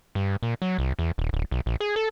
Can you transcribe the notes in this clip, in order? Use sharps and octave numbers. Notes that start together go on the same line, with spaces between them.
G2
A#2
F#3
C2
E2
D#1
D1
B1
A#1
G#4
A4